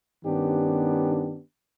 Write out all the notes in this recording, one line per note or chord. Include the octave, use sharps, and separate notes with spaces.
G2 D#3 B3 C#4 D4 G4